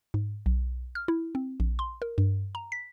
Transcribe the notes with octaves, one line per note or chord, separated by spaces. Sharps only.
G#2
B1
F6
E4
C4
A#1
C6
A#4
G2
A#5
B6